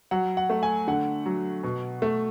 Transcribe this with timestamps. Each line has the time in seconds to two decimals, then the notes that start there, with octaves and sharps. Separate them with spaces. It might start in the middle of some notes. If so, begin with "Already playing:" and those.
0.11 F#3 F#5
0.37 F#5
0.50 A3
0.63 G#5
0.88 D3 F#5
1.26 F#3
1.63 B2
2.02 A3